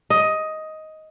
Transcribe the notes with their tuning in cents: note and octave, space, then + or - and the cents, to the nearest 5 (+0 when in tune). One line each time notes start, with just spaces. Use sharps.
D#5 +10